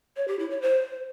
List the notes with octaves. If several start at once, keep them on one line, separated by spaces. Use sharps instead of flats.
C#5
G4
E4
C#5
C5